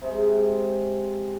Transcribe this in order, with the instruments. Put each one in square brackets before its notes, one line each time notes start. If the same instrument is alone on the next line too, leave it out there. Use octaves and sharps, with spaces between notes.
[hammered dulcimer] C3 G#3